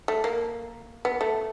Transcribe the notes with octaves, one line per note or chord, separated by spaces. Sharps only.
A3
A#3
B3
A3